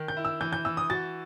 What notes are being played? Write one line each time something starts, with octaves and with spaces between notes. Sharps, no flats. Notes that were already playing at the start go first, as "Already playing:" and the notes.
Already playing: D#3
G6
E4
E6
E3 G6
G6
E3 E6
D#6
F#4 A6